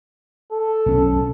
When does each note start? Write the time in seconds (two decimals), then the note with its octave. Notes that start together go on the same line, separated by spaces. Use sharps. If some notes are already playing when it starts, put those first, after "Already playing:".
0.52 A4
0.86 B1 C#4